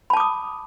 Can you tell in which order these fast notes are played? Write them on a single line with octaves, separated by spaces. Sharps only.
B5 A5 D6 D#6